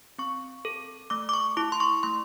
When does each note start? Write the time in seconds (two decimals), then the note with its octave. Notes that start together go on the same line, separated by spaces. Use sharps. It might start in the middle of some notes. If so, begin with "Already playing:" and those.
0.18 C4 C#6
0.65 A4
1.10 A3 D6
1.29 D6
1.34 C#6
1.57 E4 D6
1.72 C6
1.80 C#6
2.03 A3 C6